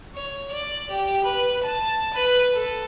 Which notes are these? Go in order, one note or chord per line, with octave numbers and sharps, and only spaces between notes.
C#5
D5
G4
B4
A5
B4
A4